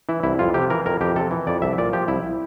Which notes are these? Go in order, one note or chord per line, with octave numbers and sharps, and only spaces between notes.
E3 E4
C2 E4
F2 F4
C3 G4
E3 A#4
F2 A#4
F2 G4
C3 A4
E3
F2 D5
C2 E5
A#2 D5
F3 G4
C2 E4